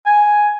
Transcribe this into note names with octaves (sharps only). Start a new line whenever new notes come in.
G#5